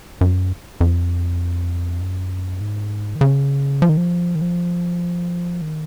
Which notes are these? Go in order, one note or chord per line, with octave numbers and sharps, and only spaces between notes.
F#2
F2
F#2
G#2
D#3
C#3
F3
D#3
F3
D#3
F3
D#3